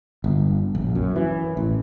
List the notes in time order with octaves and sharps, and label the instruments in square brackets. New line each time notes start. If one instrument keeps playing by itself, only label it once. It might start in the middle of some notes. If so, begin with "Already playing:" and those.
[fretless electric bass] G1
A#1
F#2
E3
A1